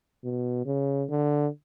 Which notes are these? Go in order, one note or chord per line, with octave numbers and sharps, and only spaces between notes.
B2
C#3
D3